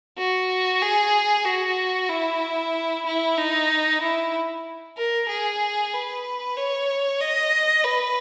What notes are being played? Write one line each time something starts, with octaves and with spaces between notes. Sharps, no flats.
F#4
G#4
F#4
E4
E4
D#4
E4
A#4
G#4
B4
C#5
D#5
B4